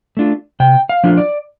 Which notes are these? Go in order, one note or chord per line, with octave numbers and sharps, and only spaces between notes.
A3 D4 F4
C3 G5
F5
F3 A3 D4 F4
D5